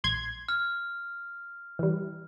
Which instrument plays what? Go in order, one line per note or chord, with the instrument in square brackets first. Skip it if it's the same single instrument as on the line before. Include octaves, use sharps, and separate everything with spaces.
[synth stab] A#1 C6 G#6
[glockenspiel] F6
[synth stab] E3 G3